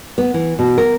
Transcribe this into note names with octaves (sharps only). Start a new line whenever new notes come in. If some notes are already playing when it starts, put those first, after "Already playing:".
B3
E3
B2
A#4